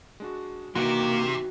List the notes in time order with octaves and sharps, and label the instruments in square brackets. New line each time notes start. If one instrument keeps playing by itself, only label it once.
[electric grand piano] G#3 D4 F#4
[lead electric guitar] C3 [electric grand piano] D#3 E3 D#4 [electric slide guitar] A#3 [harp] F#4